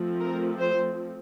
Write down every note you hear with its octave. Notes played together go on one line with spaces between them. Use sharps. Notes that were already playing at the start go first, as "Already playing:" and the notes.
Already playing: F3 A3 C4
A#4
C5